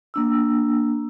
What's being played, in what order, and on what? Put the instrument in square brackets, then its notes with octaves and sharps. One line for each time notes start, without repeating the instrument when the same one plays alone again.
[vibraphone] A#3 D4 E6